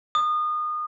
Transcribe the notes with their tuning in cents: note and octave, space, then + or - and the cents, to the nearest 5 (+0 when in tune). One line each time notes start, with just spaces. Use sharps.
D#6 -30